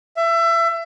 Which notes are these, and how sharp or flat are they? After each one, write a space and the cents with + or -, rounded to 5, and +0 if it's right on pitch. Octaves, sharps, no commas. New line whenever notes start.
E5 +25